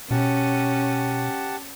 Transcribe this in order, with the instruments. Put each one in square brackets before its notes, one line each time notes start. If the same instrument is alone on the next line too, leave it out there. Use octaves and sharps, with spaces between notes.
[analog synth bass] B2 [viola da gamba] C#4 [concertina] G4 F#5 A5